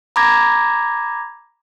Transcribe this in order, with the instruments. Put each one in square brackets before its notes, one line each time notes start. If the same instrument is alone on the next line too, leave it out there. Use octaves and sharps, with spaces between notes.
[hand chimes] A#5 B5 D6 G#6 A#6